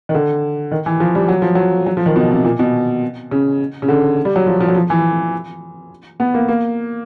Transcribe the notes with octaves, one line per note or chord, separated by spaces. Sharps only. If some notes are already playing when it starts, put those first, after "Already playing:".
D#3
D3
D#3
E3
F3
G3
F#3
F3
F#3
F#3
F3
D#3
B2
C3
A#2
B2
C#3
C#3
D3
G3
F#3
F3
F3
F#3
F3
E3
B3
A#3
A#3